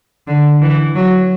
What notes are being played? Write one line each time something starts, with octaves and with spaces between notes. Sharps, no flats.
D3
E3
F#3